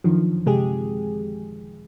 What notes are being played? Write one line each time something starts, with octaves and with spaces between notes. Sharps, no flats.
F#2 D3 D#3 F3
C3 G#3 G4 G#4